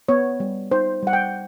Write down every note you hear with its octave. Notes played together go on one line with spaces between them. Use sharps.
B3 C#5
G3
D#4 C5
G3 F#5
G5